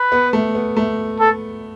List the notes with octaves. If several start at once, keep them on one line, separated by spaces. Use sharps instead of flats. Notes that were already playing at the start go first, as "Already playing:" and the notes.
Already playing: B4
B3
A3
B3
A3
A4